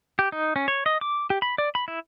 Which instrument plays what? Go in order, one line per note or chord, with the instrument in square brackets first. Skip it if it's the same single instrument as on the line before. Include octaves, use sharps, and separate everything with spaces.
[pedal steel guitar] G4
D#4
C#4
C#5
D#5
D6
G4
B5
D5
B5
E4